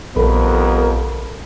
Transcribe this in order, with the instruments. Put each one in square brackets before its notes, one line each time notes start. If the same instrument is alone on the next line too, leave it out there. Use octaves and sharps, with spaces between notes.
[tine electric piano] A#1 [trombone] F2 [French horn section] G3 B3 A#4 [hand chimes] A4 B5